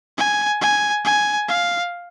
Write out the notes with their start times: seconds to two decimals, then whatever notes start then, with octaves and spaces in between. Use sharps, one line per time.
0.17 G#5
0.61 G#5
1.05 G#5
1.49 F5